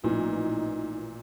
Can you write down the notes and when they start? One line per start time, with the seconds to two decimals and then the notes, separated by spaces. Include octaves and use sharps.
0.04 A1 A#2 E3 F3 D#4